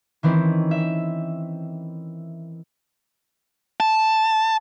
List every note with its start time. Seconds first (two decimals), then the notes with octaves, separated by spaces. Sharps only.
0.23 D#3 E3 C4 C#4 E4
0.71 E5
3.80 A5